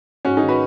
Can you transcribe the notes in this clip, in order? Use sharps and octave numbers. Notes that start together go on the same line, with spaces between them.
G#2 C#4 F#4
D#4 G#4
D#3
F#4 B4